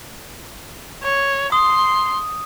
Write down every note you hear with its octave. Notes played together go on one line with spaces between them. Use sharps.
C#5
C6 D#6